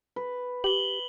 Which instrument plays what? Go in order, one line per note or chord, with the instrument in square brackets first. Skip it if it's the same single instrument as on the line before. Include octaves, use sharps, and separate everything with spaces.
[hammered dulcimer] B4
[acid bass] G4 [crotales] F#7 G7